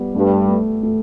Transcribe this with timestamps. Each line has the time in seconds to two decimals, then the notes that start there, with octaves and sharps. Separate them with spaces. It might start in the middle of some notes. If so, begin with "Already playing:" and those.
Already playing: G3 B3
0.14 G2 A3
0.48 A3
0.83 A3